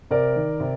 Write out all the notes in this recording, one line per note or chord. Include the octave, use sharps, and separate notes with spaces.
C3 A#4 D5
D#3
C3